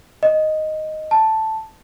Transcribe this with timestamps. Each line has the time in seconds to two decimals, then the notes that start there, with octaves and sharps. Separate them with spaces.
0.23 D#5
1.11 A5